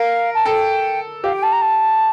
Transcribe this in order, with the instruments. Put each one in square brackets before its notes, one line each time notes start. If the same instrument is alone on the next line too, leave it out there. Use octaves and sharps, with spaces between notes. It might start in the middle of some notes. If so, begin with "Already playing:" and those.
Already playing: [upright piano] A#4 [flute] F5
[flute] A5
[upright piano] A4 [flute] G5
[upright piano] G4 [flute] F5
[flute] G5
A5
A#5
A5